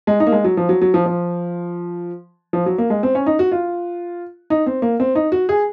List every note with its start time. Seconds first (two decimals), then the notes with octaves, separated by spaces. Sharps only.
0.07 G#3
0.20 D#4
0.27 A#3
0.32 G#3
0.44 F#3
0.57 F3
0.69 F#3
0.82 F#3
0.94 F3
1.06 F3
2.53 F3
2.66 F#3
2.78 A#3
2.90 G#3
3.03 C4
3.15 C#4
3.26 D#4
3.39 F#4
3.52 F4
4.50 D#4
4.66 C4
4.82 A#3
5.00 C4
5.15 D#4
5.32 F#4
5.49 G#4